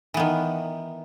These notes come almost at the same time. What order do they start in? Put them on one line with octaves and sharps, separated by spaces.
E3 B3 D#3